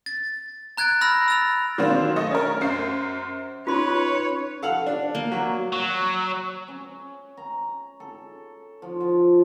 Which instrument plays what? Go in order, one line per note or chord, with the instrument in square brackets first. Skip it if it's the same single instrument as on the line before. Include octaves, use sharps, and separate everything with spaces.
[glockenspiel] A6
A#5 F#6 G#6 A6 D7
B5 E6 F6 A#6
E6 A6 F7
[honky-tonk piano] D#3 F#3 A#3 C4 D4
A3 D#5
C#4 A#4
F#2 C5 C7
[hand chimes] C#4 D#4 [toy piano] F4 C6 [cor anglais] B4 [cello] C#5
[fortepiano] A4 F5 F#5
D4
[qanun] A#3
[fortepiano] F#3
[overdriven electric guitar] F#3
[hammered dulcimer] C#4
A#5
A4
F3
F3